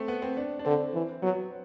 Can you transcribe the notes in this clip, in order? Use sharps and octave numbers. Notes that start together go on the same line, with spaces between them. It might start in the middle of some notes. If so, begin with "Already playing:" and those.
Already playing: A3 C4
B3
C4
D4
D4
D3 C4
E3
F#3 B3